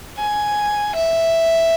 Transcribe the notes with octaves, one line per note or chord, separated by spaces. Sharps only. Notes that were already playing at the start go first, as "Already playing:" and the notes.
G#5
E5